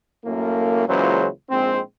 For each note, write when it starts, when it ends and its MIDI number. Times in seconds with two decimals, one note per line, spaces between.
0.25 0.84 42
0.25 0.84 45
0.25 0.84 57
0.25 0.84 58
0.88 1.27 37
0.88 1.27 46
0.88 1.27 49
0.88 1.27 52
0.88 1.27 54
0.88 1.27 72
1.50 1.80 34
1.50 1.80 44
1.50 1.80 56
1.50 1.80 60